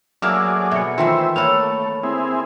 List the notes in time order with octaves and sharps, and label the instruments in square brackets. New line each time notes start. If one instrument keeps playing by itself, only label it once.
[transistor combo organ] F#3 G#4 D5 [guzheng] A3 A#3 A#4
[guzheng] B2 [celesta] E5 C#7
[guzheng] D#3 E3 A3 [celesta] F4 [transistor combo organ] C5 E5
[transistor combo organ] A3 [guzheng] A#3 A4 [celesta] C#5 B5 F7
[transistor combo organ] C4 E4 G#4